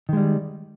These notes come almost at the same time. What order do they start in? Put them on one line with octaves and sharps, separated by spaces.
D#3 G#3 G3